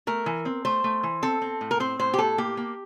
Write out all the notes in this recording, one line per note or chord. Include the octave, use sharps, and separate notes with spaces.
A3 A#4
E3
C4
A3 C5
A3
E3
C4 A4
C4
A2
A#4
C4 C5
A2 C5
G4
A2 A4
A#3 G4
A#3